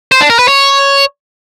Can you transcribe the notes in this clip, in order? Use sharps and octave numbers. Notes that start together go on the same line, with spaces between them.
C5
D4
A#4
B4
C#5